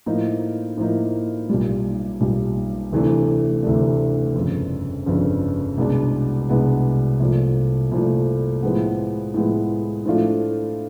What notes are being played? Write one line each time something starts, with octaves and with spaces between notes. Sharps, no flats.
A2 F3 A#3 D#4
A2 F3 A#3 D#4
B1 A#2 G3
B1 A#2 G3
D2 C3 E3 A3 D4
D2 C3 E3 A3 D4
G1 F2 C#3
G1 F2 C#3
C2 B2 G#3 B3 D4
C2 B2 G#3 B3 D4
C2 A#2 F3 A3
C2 A#2 F3 A3
A2 F3 G#3 B3
A2 F3 G#3 B3
A2 F3 A3 D4 F4